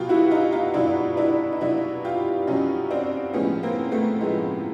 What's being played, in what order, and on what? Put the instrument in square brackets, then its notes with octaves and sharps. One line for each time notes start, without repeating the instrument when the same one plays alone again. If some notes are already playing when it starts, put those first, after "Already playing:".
Already playing: [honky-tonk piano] B2 F#3 F4 G4
E4 F#4
D#4 F4
D#4 F4
B2 F#3 D4 E4
D4 E4
D#4
B2 F#3 D4 E4
F4 G4
B2 F#3 C#4 D#4
C4 D4
A2 F3 G#3 B3 C#4
A#3 C4
A3 B3
A2 F3 G#3